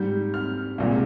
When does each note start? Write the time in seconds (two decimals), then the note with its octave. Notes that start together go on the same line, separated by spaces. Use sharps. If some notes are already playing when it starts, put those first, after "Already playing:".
Already playing: G#2 G3 G6
0.34 F6
0.78 C2 A#2 G#3